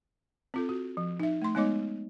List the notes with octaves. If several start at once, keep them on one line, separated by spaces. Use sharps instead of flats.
C4 F4 A4
F#4
F3
D#4 E5
A3 C6
G#3 B3 D#4 C#5 D#5 D6